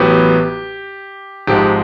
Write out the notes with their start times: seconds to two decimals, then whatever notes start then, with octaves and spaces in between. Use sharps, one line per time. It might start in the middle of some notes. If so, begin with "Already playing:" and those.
Already playing: A1 A2 F#3 B3 G4
1.47 G#1 G#2 F3 G#3 G4